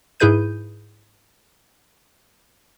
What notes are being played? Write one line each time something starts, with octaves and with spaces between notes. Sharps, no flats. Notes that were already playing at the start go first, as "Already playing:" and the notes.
G#2 E4 G#4 B4 G6 D#7